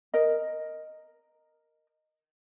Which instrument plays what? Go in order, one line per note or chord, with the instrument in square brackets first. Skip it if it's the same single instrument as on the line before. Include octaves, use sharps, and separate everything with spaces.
[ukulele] A#4 D#5